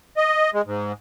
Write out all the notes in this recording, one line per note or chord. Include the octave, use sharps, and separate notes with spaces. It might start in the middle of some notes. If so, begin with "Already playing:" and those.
D#5
G#3
G#2